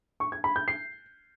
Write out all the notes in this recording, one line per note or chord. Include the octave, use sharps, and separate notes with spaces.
C#6
G#6
B5
G6
C7